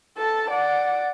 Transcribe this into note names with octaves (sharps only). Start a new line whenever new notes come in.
A4 A5
D5 F#5